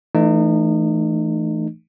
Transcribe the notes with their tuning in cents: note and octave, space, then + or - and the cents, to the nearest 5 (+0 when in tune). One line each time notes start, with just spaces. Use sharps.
E3 +10 A3 +5 D#4 -35